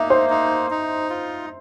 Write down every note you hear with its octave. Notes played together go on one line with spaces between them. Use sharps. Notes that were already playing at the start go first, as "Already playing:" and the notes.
Already playing: A#3 D#4 E5
C5
D#4
D#4
F4